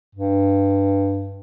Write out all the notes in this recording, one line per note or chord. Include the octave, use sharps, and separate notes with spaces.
G2